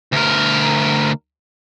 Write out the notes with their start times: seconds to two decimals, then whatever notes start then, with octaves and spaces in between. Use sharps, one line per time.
0.13 D2 A#4